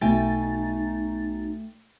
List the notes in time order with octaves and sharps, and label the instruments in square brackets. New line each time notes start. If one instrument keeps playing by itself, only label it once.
[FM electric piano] B1 B2 A6 [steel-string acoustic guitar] A3 G5 G#5 [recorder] D#4